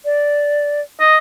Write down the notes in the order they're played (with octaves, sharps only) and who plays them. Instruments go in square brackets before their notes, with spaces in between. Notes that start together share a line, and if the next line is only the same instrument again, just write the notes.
[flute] D5
[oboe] D#5